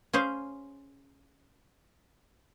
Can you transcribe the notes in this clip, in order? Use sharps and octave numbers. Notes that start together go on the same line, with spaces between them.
C#4 G#4 C5 F5